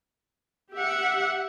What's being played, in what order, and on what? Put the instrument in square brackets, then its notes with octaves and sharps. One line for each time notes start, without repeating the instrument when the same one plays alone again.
[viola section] G4 E5 F#5